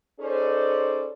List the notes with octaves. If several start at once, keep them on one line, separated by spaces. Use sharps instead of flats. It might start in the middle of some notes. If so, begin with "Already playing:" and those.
C#4 D#4 G#4 A4 C5 D5